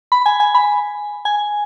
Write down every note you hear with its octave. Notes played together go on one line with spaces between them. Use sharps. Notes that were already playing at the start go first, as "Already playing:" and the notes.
B5
G#5
G#5
B5
G#5